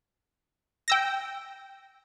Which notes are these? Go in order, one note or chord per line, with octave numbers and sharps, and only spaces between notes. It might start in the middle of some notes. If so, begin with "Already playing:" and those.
G5 E6 A#6